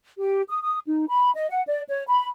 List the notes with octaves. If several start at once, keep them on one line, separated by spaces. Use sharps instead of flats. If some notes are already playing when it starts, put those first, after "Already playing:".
G4
D#6
D#6
D#4
B5
D#5
F#5
D5
C#5
B5